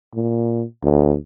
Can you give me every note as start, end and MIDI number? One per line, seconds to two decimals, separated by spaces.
0.15 0.63 46
0.84 1.16 38